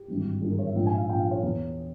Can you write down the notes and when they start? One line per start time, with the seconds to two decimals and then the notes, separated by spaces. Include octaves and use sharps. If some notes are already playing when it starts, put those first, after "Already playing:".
Already playing: G4
0.08 G#1 G2 E3
0.42 G#1 G2 E3 G#4
0.50 A#4
0.59 C#5
0.67 E5
0.75 A#1 G#2 F3 G5
0.86 G#5
0.93 E5
0.98 F5
1.09 A#1 G#2 F3 G5
1.20 F5
1.31 C#5
1.43 E2 E3